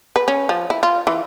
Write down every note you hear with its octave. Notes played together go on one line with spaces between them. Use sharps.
B4
C#4
F3
E4
F4
E3